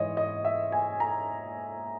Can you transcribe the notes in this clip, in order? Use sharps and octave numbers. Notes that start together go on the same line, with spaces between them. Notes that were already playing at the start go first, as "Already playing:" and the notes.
Already playing: G#2 E3 C#5 D#5
D#5
E5
G#5
A#5